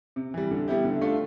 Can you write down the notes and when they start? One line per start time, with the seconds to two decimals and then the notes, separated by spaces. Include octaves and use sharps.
0.16 C3
0.34 E3 G3
0.51 D3
0.68 G3 B3 E4 G4
0.84 D3
1.01 A3 D4 F4